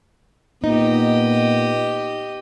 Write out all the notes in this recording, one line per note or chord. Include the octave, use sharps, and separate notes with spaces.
A#2 B3 D#4 G4 D#5